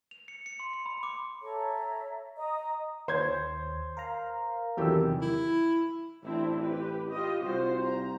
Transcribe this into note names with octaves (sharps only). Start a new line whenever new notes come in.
F7
C#7
C#7
C6
C#7
B5
D6
A4 C#5 E5 A#5
D#5 A#5 D#6
D#2 C5 C#5 G#6
A#4 F5 A#5
E2 C3 D#3 F#3 E4 G4 A4 E6
E4
A1 C4 D4 E4
G4 B4
F4 G4 D#5
C2 F4 F#4 C5
A#5